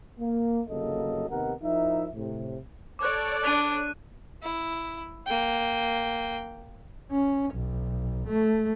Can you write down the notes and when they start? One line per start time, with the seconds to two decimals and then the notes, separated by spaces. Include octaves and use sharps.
0.20 A#3
0.68 G1 C#3 F#3 A#3 A4 D#5
1.30 D#2 C3 B3 D#4 A#4 F#5
1.63 F3 D#4 E4 A#4 E5
2.14 A2 C3
2.99 A4 C#5 D5 D6 F#6
3.44 D4 F#6 D#7
4.42 E4
5.26 A#3 G5
7.12 C#4
7.55 B1
8.28 A3